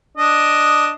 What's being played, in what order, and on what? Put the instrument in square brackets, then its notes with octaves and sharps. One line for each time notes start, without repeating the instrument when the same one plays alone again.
[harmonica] D4 D#5